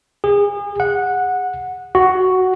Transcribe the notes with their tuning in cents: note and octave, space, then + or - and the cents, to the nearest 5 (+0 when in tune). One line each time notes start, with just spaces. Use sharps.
G#4 -35
F#5 -15
F#4 +5